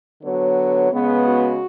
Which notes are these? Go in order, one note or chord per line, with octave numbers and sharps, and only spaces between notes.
D3 F#3 B3 C#5
C#3 G#3 B3
F#4